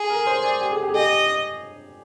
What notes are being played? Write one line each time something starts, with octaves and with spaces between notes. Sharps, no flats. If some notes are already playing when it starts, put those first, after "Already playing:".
Already playing: G#4
A#4
C5
D5
G4
G#4
G4
G#4
G4 D#5